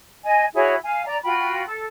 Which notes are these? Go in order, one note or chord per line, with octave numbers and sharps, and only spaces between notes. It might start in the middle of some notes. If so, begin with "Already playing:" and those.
D#5 G#5
E4 F#4 G#4 C#5
F5 G#5
D5 A#5
F4 F#4 G5 B5
A4